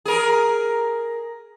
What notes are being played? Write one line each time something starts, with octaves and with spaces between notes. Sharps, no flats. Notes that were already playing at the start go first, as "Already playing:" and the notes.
G#4 A#4